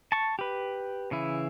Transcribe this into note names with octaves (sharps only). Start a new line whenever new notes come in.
A5 C#6
G4 B4
C#3 E3 E4